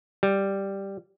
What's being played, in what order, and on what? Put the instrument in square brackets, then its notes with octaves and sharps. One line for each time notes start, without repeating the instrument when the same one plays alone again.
[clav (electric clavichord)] G3